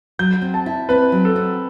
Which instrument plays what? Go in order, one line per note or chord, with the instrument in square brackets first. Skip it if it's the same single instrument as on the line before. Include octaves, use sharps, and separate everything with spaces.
[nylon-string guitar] F#3 [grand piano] G6
[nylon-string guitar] C4
[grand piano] A5
[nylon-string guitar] E4
[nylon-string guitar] C4 [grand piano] B4
[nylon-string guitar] F#3
[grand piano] A4
[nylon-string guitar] C4